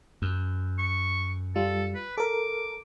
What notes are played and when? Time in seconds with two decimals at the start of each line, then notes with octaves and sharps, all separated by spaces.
0.22 F#2
0.79 C#6
1.56 G3 F4 A4
1.95 B4
2.18 A4 A#4 D6